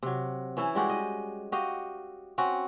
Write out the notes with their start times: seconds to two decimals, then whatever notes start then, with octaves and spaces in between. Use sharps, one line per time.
0.03 C3 F#3
0.57 E3 C#4 E4
0.75 G3 G#3 F#4 G4
0.89 D#5
1.52 F#4 G4 D#5 F5
2.38 C4 C#4 F#4